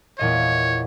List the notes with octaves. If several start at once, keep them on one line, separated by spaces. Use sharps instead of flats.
E2 A#2 C#5 D#5